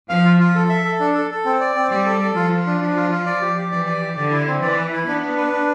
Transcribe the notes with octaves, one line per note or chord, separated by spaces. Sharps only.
F3 F5
F4
F4
A4
E5
A4
D4
A4
A4
C4
D5
C4
G3 D5
A4
A4
F3 F4
F4
D4
D4
F4
F4
D5
G4
G4
E3 D5
D5
G4
D3 D5
E4
C4
E3 D5
B4
E4
B3 D4
D4
B4
D4